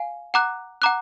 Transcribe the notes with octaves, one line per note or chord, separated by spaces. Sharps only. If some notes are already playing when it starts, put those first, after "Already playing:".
Already playing: F5 G#5
F#5 A#5 D6 F#6
F#5 A#5 D6 F#6